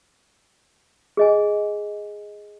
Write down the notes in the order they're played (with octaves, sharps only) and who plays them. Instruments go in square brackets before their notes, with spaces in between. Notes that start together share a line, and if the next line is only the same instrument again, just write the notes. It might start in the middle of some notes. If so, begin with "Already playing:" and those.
[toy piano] G#4 D#5 G#5